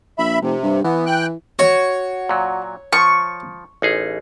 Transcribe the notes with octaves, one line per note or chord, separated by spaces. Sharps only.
A#1 E5 B5
F1 C3
G2
E3 B3
G5 F#6
F#4 C#5
A#2 F#3
F3 C#6
A1 D#4 G#4